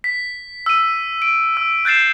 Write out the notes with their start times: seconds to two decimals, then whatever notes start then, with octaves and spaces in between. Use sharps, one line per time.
0.04 B6
0.66 E6 D#7
1.22 D7
1.57 E6
1.85 F#6 G6 A6 C7 E7